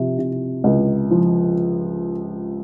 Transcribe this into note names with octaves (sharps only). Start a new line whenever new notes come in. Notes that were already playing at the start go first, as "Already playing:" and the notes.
Already playing: C3 F3
C3
C#2
F3